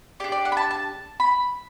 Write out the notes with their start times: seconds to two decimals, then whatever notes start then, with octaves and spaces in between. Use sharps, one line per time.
0.20 D4 G4 D5
0.32 D5
0.45 F#5
0.52 B5
0.57 A5
0.71 A5
1.20 B5